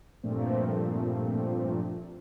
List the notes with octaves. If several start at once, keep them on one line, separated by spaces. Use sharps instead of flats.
G2 A#2 F3 A3 C4